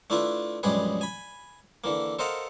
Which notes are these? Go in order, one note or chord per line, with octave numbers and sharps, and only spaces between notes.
A3 D4 E4 F4 B4
A#1 F#2 G3 G#3 G#4 B4
G#5 B5
D3 E3 A#3
A4 A#4 C5 D#5 F5 F#5